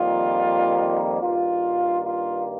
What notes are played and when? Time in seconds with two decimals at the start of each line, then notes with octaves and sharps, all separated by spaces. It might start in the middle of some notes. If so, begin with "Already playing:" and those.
Already playing: F2 D#3 G3 A#3 F4
1.21 G2 D#3 A#3 F4
2.06 F4